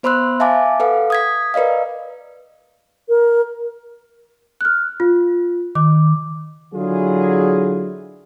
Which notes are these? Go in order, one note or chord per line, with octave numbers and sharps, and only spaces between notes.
B3 C5 B5 C6 E6 F#6
E5 F5 G#5 A5 D6
A4 B4 F5 F#5
D#6 G#6 B6
A#4 B4 D5 D#5 F5
A#4
F6 F#6
F4
D#3 D6
D3 F#3 E4 F4 G#4